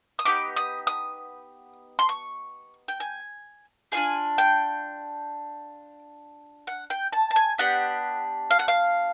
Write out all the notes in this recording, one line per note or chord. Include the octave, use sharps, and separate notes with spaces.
D#6
B3 D#4 G4 D6
D#6
D#6
C6
C#6
G5
G#5
D4 F4 G#4 G#5
G5
F#5
G5
A5
A5
G#5
B3 D4 G4 F#5
F5
F#5
F5